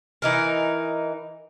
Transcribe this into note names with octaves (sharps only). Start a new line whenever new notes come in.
E3 D#4 A#4